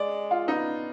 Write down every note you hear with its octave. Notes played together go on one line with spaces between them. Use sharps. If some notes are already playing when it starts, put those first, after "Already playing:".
Already playing: G#3 D5
F4
B3 D#4